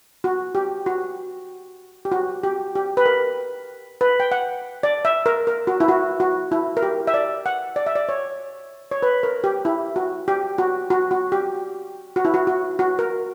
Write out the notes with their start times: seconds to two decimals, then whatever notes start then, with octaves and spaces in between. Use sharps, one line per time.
0.24 F#4
0.55 G4
0.86 F#4
2.05 G4
2.12 F#4
2.44 G4
2.75 G4
2.97 B4
3.06 A#4
4.01 B4
4.20 G5
4.32 F#5
4.83 D5
5.05 E5
5.26 A#4
5.47 A#4
5.67 F#4
5.80 E4
5.88 F#4
6.20 F#4
6.52 E4
6.77 A#4
6.83 G4
7.07 E5
7.14 D5
7.46 F#5
7.76 D5
7.87 E5
7.96 D5
8.09 C#5
8.91 C#5
9.03 B4
9.23 A#4
9.44 G4
9.65 E4
9.96 F#4
10.28 G4
10.58 F#4
10.90 F#4
11.11 F#4
11.32 G4
12.16 F#4
12.25 E4
12.34 F#4
12.47 F#4
12.79 F#4
12.99 A#4